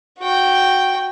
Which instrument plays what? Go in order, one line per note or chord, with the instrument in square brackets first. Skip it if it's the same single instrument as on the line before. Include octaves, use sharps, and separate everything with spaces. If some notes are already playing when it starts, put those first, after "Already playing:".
[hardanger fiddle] F#4 G5